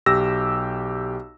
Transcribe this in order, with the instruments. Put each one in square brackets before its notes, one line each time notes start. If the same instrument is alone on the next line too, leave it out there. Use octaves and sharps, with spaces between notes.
[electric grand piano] B1 G4 E6 A#6